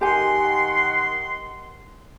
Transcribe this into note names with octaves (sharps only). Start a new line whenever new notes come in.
D#3 G4 F#5 G#5 C6